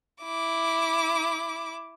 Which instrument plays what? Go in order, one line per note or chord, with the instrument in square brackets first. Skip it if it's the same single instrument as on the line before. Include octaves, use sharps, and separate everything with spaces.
[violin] E4 D6